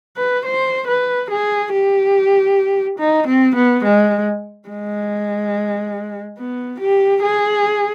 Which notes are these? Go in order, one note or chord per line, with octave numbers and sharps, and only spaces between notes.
B4
C5
B4
G#4
G4
D#4
C4
B3
G#3
G#3
B3
G4
G#4